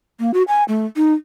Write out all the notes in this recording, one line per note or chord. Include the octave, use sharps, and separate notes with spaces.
A#3
F#4
G#5
A3
D#4